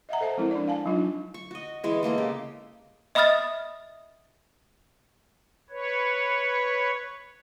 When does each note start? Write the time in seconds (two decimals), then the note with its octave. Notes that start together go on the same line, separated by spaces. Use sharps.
0.09 D#5 E5 F#5 A#5
0.21 A4 C5 E5 A5
0.37 F3 G#3 C4 E4 A#4
0.51 D4 D5
0.68 F5 G#5 A5
0.86 F#3 D4 D#4 F4
1.34 C#6
1.51 F#4 D#5
1.84 E3 G#3 B3
2.03 G#3 A#3 A4 D#5
2.18 C#3 G4
3.15 D#5 E5 B5 D#6 F6 A6
5.70 B4 C#5